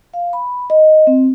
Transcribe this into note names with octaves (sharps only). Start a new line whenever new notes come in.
F5
B5
D#5
C4